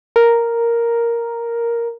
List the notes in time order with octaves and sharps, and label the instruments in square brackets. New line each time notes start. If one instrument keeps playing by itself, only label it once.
[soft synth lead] A#4